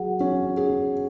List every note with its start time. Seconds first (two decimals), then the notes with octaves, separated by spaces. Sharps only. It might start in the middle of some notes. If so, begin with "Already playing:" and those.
Already playing: F#3 G#4 F#5
0.20 C#4
0.57 G#4